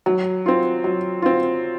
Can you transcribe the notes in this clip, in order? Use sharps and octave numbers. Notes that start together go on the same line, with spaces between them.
F#3
C4 F4
F#3
C4 F4